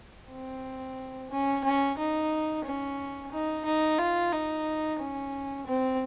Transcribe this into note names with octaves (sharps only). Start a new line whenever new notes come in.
C4
C#4
C#4
D#4
C#4
D#4
D#4
F4
D#4
C#4
C4